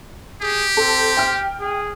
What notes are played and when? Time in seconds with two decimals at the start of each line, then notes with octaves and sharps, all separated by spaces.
0.42 G4 G#4
0.77 C4 A4
1.17 G5 F6
1.60 G#4